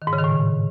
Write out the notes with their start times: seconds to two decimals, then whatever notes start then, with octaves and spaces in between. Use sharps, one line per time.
0.02 D#3
0.07 G#2
0.13 C#3
0.18 D#3
0.24 A2